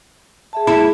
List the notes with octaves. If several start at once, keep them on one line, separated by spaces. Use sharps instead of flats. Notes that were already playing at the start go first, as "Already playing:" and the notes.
G#4 E5 A5
G#3 E4 G#4